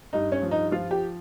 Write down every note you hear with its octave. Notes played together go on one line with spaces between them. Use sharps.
G2 D#4
C#4
F3
D#4
F3 F4
G4